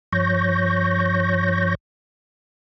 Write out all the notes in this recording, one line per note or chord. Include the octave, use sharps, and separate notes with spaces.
G2 F3 C#5 C#6 G6 A#6